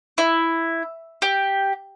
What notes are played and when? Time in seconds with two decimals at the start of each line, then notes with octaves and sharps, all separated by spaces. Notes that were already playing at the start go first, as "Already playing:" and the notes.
0.18 E4
1.22 G4